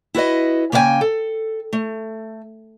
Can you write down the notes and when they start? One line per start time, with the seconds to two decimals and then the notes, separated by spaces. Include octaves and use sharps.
0.14 E4 F#4 B4 D#5
0.72 C#3 A#3 B4 E5 G5 G#5
1.01 A4
1.73 A3